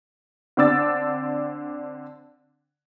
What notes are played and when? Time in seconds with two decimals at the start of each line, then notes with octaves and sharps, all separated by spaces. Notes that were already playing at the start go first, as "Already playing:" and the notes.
0.57 D3 C4 D4 D6 E6 A6